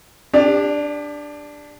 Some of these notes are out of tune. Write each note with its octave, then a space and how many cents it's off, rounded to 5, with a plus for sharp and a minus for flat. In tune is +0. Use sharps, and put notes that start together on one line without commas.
D4 +0 G4 +35